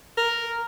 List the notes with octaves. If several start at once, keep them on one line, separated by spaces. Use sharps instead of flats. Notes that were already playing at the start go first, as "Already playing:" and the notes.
A#4